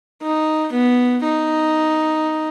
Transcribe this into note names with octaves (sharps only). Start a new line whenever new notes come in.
D#4
B3
D#4